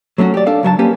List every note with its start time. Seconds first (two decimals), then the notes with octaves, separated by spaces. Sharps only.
0.18 F#3 A3 C#4 F4 F#4
0.34 G4 D5
0.46 D4 A4 F5
0.63 C#2 F#3 E5 A5
0.79 A#3 C#4 G4 B4